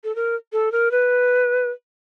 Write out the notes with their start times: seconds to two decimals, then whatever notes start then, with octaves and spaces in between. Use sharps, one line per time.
0.04 A4
0.16 A#4
0.53 A4
0.72 A#4
0.91 B4